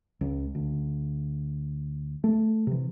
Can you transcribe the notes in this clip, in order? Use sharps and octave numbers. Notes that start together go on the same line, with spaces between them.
C#2
D2
A3
C3 E3